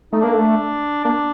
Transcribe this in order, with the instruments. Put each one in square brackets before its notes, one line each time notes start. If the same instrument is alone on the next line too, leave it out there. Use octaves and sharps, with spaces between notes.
[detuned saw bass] A3 [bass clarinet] D#4
[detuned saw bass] A#3 [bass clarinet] D4
[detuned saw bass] A3
[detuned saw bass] A#3 [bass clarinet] D4